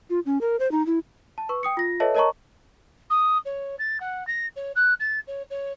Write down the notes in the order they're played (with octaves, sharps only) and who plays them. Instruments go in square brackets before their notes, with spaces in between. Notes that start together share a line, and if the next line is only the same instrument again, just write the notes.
[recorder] F4
C#4
A#4
C5
D#4
E4
[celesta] A5
B4 C#6
G5 D#6 C#7
F4 A#6
A4 B4 C#5 D#5 E5 A5
A#4 C#5 D#5 A5 A#5 C#6
[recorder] D#6
C#5
A6
F#5
A#6
C#5
F#6
A6
C#5
C#5